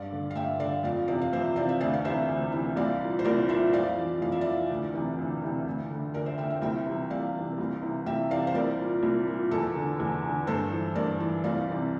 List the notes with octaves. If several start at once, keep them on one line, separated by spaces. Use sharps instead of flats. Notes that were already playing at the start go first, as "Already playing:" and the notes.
Already playing: G2 D5 F5
D3
F5
G2 E5 G5
D3 D5 F5
F2 D5 F5
C3 E3 D5 F5
F5
F2 C5 E5
C3 E3 D5 F5
E5
D2 D5 F5
F5
C3 E3 C5 E5
D2
C3 E3
C2 D5 F5
A#2
C5
C2 A#4 D5
A#2 C5 E5
F2 D5 F5
E3
F2 F5
E5
E3 D5 F5
D2
C3 E3
D2
C3 E3
D2
D3
D2 A#4 D5
C5 E5
D3 E5 G5
E5 G5
C2 E5 G5
C3 E3
C2 D5 F5
C3 E3
C2
C3 E3
C2 E5 G5
C3 E3 D5 F5
C5
C2 A#4 D5
A#2
C2
A#2
E2 A4
D3
E2
D3
G2 A4 C5
E3
G2 A#4 D5
E3
C2 D5 F5
C3 E3